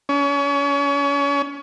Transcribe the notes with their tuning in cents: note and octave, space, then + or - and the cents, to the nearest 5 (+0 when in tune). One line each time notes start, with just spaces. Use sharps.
C#4 +30